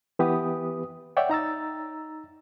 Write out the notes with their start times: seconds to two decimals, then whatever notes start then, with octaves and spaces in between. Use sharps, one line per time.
0.19 E3 B3 G4 B4 D#6
1.17 C#5 D5 E5 F#5 G5
1.30 D#4 A#5 E6 A6